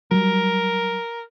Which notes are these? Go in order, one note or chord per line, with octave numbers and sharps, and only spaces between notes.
F#3 G3 A#4